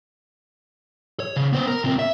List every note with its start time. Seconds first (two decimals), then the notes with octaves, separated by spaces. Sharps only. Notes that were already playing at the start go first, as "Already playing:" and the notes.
1.20 C#5
1.36 C#3
1.53 B3 C5
1.67 A#4
1.84 C#2 C4
1.99 E5